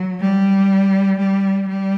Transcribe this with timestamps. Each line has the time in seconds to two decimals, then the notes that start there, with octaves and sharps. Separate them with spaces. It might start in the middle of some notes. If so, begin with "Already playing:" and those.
Already playing: F#3
0.20 G3
1.19 G3
1.68 G3